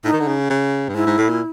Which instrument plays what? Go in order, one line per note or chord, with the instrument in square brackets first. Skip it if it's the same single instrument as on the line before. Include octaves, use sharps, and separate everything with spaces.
[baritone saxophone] A2 [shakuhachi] D#4
[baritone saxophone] D#3
D3
C#3
C#3
G2
[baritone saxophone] G#2 [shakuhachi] E4
[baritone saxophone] G#2
A2
A#2